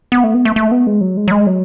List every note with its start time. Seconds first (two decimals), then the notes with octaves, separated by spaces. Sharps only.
0.12 B3
0.24 A3
0.34 B3
0.45 A3
0.56 A3
0.71 B3
0.87 G#3
1.01 F#3
1.17 G#3
1.28 F#3
1.31 G#3
1.47 F#3